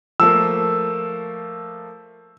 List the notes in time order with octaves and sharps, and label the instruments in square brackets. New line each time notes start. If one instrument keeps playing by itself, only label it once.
[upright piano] F3 A3 A#3 [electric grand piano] E6